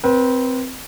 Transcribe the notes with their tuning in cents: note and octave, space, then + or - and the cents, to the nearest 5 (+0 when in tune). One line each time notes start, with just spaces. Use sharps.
C4 -10 B4 -35